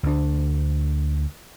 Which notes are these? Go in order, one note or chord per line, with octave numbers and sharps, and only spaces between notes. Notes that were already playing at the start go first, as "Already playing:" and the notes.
D2 D4